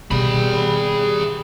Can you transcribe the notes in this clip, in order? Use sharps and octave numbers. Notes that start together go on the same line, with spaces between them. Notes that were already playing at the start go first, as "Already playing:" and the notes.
B2 G3 G#4 B5